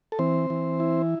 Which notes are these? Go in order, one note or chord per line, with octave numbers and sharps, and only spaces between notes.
A4
E3 C4 C5
E3
E4